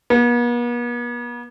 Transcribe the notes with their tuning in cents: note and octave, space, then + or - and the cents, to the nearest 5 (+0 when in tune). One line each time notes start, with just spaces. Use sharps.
B3 -45